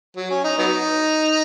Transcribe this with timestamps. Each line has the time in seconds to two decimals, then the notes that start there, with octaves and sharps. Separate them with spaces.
0.16 F#3
0.30 C#4
0.44 D#4
0.58 F#3 B3 D#4